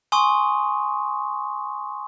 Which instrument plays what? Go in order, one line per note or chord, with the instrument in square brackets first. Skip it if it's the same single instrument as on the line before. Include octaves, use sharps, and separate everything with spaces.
[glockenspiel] G#5 C6 C#6 D#6